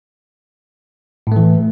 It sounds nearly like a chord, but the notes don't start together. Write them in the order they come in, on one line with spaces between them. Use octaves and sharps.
A2 A3 E3